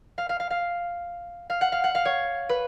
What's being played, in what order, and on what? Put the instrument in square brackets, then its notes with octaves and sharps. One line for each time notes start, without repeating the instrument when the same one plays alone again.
[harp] F5
F5
F5
F5
F5
F#5
F5
F#5
F5
C#5
B4